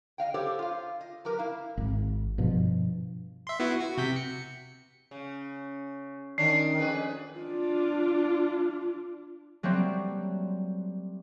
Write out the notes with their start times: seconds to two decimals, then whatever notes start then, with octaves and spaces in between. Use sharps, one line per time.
0.18 D#5 F5 G5
0.34 G4 A4 C5 C#5 F#5
0.59 F4 F5
1.01 D#5
1.25 F#3 G4 A#4 B4
1.39 E4 F5
1.77 G#1
2.38 G2 B2 F3
3.47 E5 C6
3.60 B3 E4 F#4
3.80 F#4
3.98 C3 G6 B6
4.16 C#7
5.11 C#3
6.38 D#3 C#4 D4 C7
6.79 F2 G#4 B4
7.39 D4 F4
9.63 F#3 G3 A3 A#3 C4